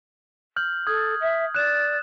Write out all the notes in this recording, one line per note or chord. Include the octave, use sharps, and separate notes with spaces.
F6 G6 F#7
A4 D#6 G#6
E5
D5 F#6 E7